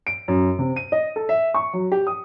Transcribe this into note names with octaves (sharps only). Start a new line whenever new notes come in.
D7
F#2
C3
D#7
D#5
A4
E5
C#6
F#3
G4
D#6